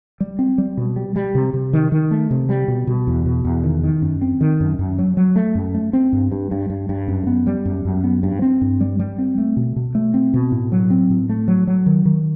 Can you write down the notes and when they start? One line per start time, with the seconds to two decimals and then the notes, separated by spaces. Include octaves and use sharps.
0.20 G3
0.39 C4
0.58 G3
0.77 B2
0.96 G3
1.16 G3
1.35 C3
1.54 C3
1.73 D#3
1.92 D#3
2.11 A3
2.31 C3
2.49 G3
2.68 B2
2.87 B2
3.07 E2
3.26 B2
3.44 E2
3.63 D#3
3.83 D#3
4.02 F#2
4.22 C4
4.41 D#3
4.60 F#2
4.79 F#2
4.99 F#3
5.17 F#3
5.36 A3
5.55 F#2
5.75 A3
5.93 C4
6.13 G2
6.32 G2
6.51 G2
6.70 G2
6.89 G2
7.08 F#2
7.27 B3
7.47 G3
7.65 F#2
7.85 F#2
8.04 B3
8.23 G2
8.42 C4
8.61 G2
8.81 G3
8.99 G3
9.18 C4
9.38 A3
9.57 B2
9.76 B2
9.95 A3
10.14 C4
10.34 B2
10.52 A2
10.72 F#3
10.90 C4
11.10 A2
11.29 A3
11.48 F#3
11.67 F#3
11.86 D#3
12.06 D#3